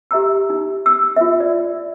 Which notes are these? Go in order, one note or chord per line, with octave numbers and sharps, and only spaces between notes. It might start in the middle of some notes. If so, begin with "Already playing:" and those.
G4 E5 A#5 E6
D#4
E6
F4 E5
D5